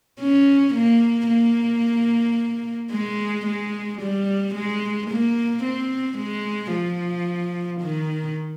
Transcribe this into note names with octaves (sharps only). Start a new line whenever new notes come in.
C#4
A#3
A#3
G#3
G#3
G3
G#3
A#3
C4
G#3
F3
D#3